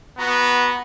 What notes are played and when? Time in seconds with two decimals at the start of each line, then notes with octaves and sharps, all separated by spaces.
0.18 B3 F#4 A#5